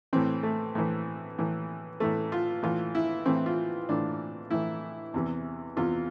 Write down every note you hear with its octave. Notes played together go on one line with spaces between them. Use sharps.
A2 E3 C4
A3
A2 E3
A2 E3
A2 E3 A3
F4
A2 E3 F4
E4
A2 E3 C4
F4
A2 E3 D4
A2 E3 E4
E2 C3 E3
E2 C3 E3 F4